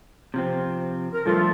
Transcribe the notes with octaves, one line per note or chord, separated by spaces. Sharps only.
C3 F3 C4
A#4
G2 F3 A3 F4 A4